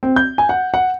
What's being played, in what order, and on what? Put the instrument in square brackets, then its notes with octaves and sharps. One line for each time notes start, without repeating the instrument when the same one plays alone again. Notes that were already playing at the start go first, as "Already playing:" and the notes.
[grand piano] C4
G6
G#5
F#5
F#5